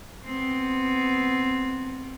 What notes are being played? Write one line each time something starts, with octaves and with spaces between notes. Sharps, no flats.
B3 C4